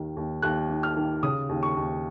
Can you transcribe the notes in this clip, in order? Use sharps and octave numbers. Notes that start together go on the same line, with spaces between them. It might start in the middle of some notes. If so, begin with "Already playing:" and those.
Already playing: D#2 D#3
D#2
D#2 F#6
D#3
F6
D#3
C#3 D#6
D#2
C#6
D#2